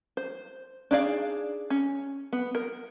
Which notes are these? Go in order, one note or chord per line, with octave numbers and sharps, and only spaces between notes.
C5
D4 D#4 G#4 D5 F5
C#4
B3
A#4